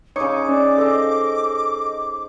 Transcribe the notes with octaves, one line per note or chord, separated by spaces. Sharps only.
C#3 D#4 C#5 C#6 D6 C#7
C#4 D5
A4 C5 D#5